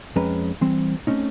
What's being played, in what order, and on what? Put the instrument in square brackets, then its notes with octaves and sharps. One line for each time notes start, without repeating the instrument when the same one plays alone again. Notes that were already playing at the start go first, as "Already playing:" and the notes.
[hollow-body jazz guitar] F2 G#3 C#4 B4 A#5
E3 G3 C4
A3 C4 C#4 D#4